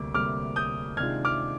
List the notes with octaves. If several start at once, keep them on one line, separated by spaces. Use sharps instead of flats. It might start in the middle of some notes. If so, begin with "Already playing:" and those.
Already playing: D2 C3 G3 A#3 D6
D2 C3 G3 A#3 D6 F6
D#6 G6
C3 D#3 G#3 D4 F4 F6 G#6
D6 F6